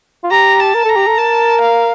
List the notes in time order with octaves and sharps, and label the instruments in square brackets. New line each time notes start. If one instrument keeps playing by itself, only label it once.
[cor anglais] F4
[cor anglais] G4 [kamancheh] A#5
[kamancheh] A5
[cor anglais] A#4
[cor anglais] A4 [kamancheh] A#5
[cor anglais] G4
A4
[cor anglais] A#4 [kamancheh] A5
[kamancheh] F5